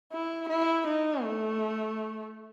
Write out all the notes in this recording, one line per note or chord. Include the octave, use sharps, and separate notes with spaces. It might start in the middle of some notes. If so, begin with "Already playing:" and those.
E4
E4
D#4
A3